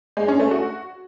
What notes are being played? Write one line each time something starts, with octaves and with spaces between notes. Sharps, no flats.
G#3
C#4
A3
F#4